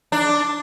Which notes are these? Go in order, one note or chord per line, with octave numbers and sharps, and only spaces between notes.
D4